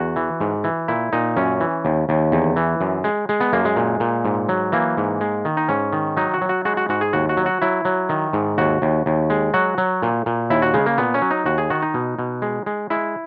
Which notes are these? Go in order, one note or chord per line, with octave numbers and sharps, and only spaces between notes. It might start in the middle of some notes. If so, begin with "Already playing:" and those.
Already playing: E2 F#4
E3
G#2
E3
A#2 E4
A#2 D#4
F#2 C#4
E3
D#2
D#2
E2
E3
F#2
G#3
G#3
B3
F#2 A#3
G#3
A#2
A#2
G#2
F#3
E3 A#3
G#2
G#3
D#3
D#4
G#2 C#4
D#3
F#3 D#4
F#4
F#3
F#4
G#3 F#4
F#4
G#2 F#4
G#4
D#2 F#4
F#4
F#3
F#4
F#3 E4
F#3
D#3
G#2
D#2 F#4
D#2
D#2
G#3
F#3 F#4
F#3
A#2
A#2
D#2 E4
F#4
C#3 G#3
A#3
A#2 B3
C#4
F#3
D#4
D#2 F#4
G#4
D#3 F#4
D#4
B2
B2
G#3
G#3
G#3 E4